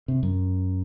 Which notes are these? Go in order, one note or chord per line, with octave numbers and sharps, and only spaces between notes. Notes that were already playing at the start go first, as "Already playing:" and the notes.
C3
F#2